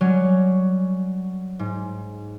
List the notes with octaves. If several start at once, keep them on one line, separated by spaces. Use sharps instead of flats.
F#3 G3 C#4
G#2